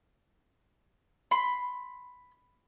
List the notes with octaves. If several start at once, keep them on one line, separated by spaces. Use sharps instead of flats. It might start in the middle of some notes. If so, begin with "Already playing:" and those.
B5 C6